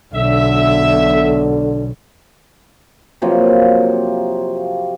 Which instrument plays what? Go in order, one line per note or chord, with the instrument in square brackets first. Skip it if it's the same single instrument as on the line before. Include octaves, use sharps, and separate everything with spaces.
[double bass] B1 B2 [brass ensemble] D3 [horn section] E5
[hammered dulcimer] C3 F3 F#3 A#3